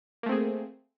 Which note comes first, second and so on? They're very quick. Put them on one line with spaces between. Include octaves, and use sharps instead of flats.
A#3 A3 C4 G#4